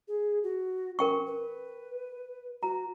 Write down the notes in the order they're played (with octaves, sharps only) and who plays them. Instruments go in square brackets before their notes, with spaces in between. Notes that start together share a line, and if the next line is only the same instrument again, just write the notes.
[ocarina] G#4
F#4
[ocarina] C#4 [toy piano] A#4 G5 C#6
[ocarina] B4
[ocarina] F#4 [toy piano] A#5